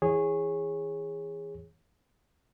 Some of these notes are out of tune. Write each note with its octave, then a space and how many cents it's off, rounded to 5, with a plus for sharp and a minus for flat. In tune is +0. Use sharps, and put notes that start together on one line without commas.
E3 -25 G#4 -15 C#5 -15